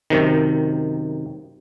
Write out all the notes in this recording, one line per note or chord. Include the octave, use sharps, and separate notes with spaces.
F#2 C3 D#3